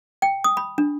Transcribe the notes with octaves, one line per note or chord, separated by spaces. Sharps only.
G5
D#6
B5
D4